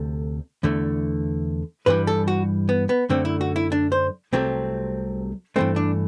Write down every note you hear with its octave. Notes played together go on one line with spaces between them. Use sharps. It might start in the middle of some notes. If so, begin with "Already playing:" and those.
Already playing: D2 C3 A3
E2 D3 A3
G2 E3 G3 B4
A4
F#4
B3
B3
F#2 D3 A3 C4
E4
F#4
E4
D4
C5
C2 C3 F#3 A3 C4
G2 E3 A3 C4
D4